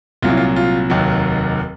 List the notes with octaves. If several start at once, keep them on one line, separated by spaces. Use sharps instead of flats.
C2 A#2 F#3 F4
E4
F4
F4
F1 D#2 D#3 F#3